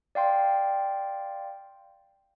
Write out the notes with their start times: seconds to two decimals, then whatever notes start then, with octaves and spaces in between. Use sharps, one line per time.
0.15 D5 F5 G5 C6